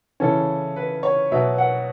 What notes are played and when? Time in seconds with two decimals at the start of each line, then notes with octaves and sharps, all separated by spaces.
0.20 C#3 E3 C#4 A4
0.76 B4
1.03 C#5
1.32 B2 F#3 B3 E5
1.58 F#5